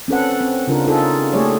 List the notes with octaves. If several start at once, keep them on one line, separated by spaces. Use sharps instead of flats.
C4 C#4 A4 B4 F#5
C4
C#3 D4 D#4 F4 A#4
D#4 F4 G#4 A4
A3 A#3 G4 G#4 C#5 D5